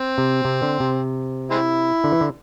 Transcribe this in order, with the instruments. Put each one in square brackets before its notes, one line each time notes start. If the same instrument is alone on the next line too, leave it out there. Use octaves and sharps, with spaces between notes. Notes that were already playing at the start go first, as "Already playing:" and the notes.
Already playing: [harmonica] C4
[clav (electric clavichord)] C3
C3
D3
C3
[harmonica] G#3 C4 E4
[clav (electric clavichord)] D3
E3
D3